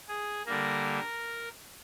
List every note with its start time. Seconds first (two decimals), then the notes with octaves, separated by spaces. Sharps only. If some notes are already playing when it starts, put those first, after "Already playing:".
0.08 G#4
0.46 D3 G3 A#3 A#4